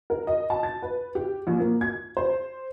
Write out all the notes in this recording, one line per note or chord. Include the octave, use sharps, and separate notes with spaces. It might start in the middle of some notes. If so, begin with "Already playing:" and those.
A#4
D#5
A5
A6
B4
G4
A#1
A#3
G#6
C5